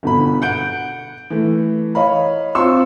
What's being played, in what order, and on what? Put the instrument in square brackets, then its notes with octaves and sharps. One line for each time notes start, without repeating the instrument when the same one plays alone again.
[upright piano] G1 B2 B5
F#5 G6 D7
E3 A3
C#5 D#5 F5 B5
C4 F4 C6 C#6 E6